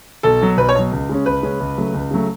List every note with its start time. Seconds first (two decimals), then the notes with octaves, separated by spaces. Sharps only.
0.23 B1 A4
0.41 B2 F#3
0.57 B1 B4
0.69 C#5
0.75 B2 F#3
0.92 C#2
1.09 C#3 G#3 C#4
1.26 C#2 B4
1.43 C#3 G#3 C#4
1.60 C#2
1.78 C#3 F#3 A3
1.94 C#2
2.11 C#3 F#3 A3